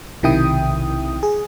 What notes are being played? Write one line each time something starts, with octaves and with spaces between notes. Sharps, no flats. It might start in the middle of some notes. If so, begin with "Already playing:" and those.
B1 C3 D#3 E4 G5 D#6
G#4